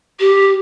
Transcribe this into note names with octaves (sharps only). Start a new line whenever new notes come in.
G4